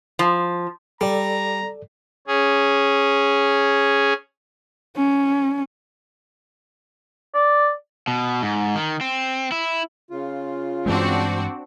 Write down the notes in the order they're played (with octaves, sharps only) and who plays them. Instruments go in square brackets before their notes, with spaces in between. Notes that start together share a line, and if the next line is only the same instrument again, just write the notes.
[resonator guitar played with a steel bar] F3
[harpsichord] G3 [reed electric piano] A4 D5 [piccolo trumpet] A#5
[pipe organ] C#4 G#4
[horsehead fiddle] C#4
[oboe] D5
[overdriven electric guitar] B2
G#2
D#3
C4
E4
[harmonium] C#3 F4
[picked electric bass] G2 E3 G#3 [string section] C4 D4 F#4